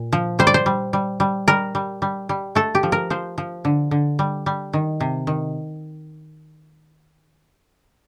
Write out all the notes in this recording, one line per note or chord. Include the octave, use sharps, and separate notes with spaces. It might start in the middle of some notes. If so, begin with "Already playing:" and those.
Already playing: A#2
F3
G3 C5
D5
C5
G3
G3
G3
G3 A#4
G3
G3
G3
A3 A4
G4
F3
A#4
F3 C5
F3
D3
D3
G3
G3
D#3
C3
D#3